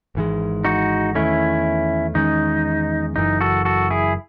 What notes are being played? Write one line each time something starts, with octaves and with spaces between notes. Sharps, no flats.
G#1 G#2 E3 G#3
D#4 F#4
E2 D#3 A3 C#4 E4
E2 D#3 G#3 C#4 D#4
F#1 F#2 E3 D#4
F#4 A4
F#4 A4
E4 G#4